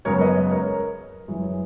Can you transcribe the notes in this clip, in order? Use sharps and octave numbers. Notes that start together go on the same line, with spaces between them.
F#2 C#3 G#3 B3 A#4 C#5
B4 D#5
A#4 C#5
F#2 E3 G#3